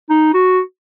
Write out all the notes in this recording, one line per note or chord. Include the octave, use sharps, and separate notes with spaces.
D#4
F#4